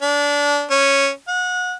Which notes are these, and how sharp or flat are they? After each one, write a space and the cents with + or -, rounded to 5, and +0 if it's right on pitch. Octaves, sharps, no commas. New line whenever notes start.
D4 -25
C#4 -5
F#5 -30